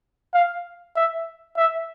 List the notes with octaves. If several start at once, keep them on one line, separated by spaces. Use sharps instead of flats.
F5
E5
E5